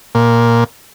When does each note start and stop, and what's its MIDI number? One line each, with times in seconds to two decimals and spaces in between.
0.15 0.64 46